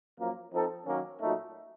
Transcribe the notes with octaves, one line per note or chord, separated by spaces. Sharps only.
F#2 F3 A#3
F3 C4 D#4 A4
F#2 D#3 F#3 A#3 C#4
A#2 F#3 A3 D#4